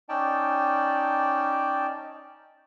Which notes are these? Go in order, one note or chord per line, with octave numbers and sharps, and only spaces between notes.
C#4 D#4 D5 G5 A5